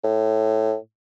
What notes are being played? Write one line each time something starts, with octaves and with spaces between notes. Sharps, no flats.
A2